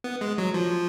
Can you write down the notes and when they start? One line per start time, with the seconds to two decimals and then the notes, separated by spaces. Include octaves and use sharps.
0.04 B3
0.21 G#3
0.38 F#3
0.54 F3